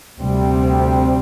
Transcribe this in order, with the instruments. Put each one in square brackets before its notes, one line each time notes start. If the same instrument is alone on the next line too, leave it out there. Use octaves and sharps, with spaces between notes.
[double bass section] D2 C3 G3 C4